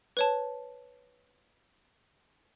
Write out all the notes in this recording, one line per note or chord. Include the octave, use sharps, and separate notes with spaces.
B4 C#5 A5